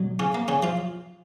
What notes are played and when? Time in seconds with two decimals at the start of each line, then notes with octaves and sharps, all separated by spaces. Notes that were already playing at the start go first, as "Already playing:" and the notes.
Already playing: B2 F#3
0.19 C#3 C#4
0.35 A#3
0.48 C#3 C#4
0.63 F3 F4